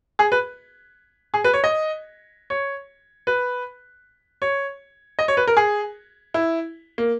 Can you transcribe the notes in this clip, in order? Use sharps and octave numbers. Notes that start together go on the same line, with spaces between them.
G#4
B4
G#4
B4
C#5
D#5
C#5
B4
C#5
D#5
C#5
B4
A#4
G#4
E4
A#3